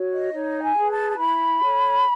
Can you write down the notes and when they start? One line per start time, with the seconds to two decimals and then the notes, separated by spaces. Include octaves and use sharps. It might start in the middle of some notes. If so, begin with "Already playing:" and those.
Already playing: F#4 C#5
0.13 D#5
0.33 D#4 C#5
0.62 G#5
0.76 G#4 B4
0.90 A5
1.10 A5
1.17 E4 B5
1.61 A4 C#5